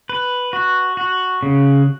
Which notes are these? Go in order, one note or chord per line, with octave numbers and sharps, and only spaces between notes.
B4
F#4
F#4
C#3